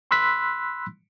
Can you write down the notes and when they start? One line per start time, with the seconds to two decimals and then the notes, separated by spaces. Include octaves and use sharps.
0.11 B5 C6 E6 F#6 B6